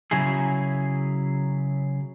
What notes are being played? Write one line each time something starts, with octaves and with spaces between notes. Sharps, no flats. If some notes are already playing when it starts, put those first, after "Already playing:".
C#3 F#3 E4 G#4